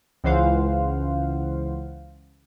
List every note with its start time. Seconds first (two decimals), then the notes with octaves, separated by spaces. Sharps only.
0.24 C#2 E3 C5 F5 F#5